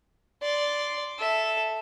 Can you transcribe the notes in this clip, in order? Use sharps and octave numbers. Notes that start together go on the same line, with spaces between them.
D5 C6
A4 E5